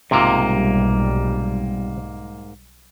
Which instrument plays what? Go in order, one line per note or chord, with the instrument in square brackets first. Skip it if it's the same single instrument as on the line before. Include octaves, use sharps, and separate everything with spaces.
[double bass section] B1 G3 [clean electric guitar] G#2 A#3 [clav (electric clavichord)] C3 F4